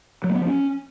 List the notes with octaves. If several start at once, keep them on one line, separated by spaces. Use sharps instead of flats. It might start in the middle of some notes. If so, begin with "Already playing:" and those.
F#3
A#3
B3
F3
C#4